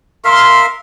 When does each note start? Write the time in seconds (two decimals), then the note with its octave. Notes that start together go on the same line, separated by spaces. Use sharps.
0.25 A#4 E5 F5 C6